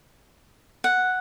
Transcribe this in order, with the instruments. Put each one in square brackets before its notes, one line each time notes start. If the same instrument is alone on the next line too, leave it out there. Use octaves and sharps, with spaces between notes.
[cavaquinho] F#5